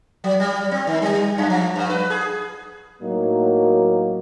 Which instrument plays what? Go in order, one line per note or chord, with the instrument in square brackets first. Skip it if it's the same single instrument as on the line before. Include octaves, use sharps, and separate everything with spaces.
[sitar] F#3
G3
C4
D#3
G3
F#2
F3
G2
B4
G#4
[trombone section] A2 F#3 A#3 D#4